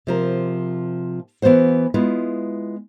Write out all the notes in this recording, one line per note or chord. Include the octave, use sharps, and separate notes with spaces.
C3 F3 A#4
E3 B3 F#4 C5 F#5
G#3 B3 E4 F4